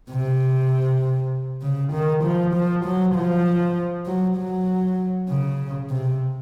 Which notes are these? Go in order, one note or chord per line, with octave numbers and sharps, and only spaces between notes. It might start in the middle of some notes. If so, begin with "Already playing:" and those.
C3
C#3
D#3
F3
F3
F#3
F3
F#3
F#3
C#3
C3